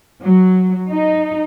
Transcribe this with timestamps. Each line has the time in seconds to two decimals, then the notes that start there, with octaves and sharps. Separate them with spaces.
0.23 F#3
0.89 D#4